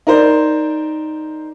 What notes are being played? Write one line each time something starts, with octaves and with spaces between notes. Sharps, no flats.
D#4 A#4 C5 D5